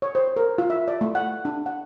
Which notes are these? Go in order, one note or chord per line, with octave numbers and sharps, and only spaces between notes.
C#5
C5
A#4
F4
E5
D5
A3
F#5
D4
F#5